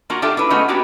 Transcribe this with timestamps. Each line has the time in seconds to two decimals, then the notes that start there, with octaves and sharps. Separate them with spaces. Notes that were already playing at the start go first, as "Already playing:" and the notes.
0.10 A#3 D4 F4 F#4 A#4
0.22 D4 F4 G4 A4 D5 E5
0.37 D4 E4 B4
0.50 G#3 A3 B3 C#4 D#4 F4
0.68 A#3 B3 D4 F#4 G4